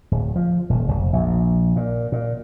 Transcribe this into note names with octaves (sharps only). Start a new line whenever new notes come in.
D1
F3
D#1
F1
A#1
A#2
A#2